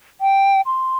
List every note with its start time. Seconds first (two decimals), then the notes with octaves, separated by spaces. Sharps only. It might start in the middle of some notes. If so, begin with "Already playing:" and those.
0.21 G5
0.66 C6